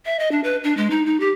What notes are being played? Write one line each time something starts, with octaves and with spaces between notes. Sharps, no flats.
E5
D#5
D4
B4
D4
G#3
D#4
D#4
G4